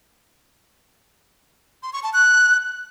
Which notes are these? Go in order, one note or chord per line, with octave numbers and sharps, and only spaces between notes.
C6
C#6
A5
F#6